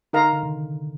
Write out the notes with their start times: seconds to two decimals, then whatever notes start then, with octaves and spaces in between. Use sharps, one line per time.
0.13 D3 D#4 A#4 F5 A#5
0.33 D3
0.43 C3 D#3